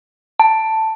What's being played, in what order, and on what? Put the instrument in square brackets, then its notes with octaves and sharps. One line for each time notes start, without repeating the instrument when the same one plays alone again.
[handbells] A5